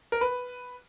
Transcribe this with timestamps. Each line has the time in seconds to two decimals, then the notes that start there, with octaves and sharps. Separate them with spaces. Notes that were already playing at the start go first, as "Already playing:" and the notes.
0.12 A#4
0.21 B4